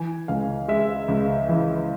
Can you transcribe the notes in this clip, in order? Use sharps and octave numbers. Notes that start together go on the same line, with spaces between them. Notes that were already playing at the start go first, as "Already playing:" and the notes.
Already playing: E3 G#5
C#2 F5
G#3 E5
C#2
E3